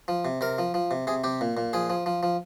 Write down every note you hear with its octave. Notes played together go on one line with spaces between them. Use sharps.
F3
C3
C3 A#4
F3
F3
C3
C3 G#4
C3 G4
A#2
A#2
F3 G#4
F3
F3
F3